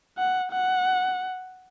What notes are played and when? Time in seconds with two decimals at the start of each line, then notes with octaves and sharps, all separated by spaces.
0.17 F#5
0.52 F#5